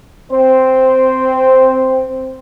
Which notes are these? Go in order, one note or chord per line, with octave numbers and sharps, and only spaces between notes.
C4 C5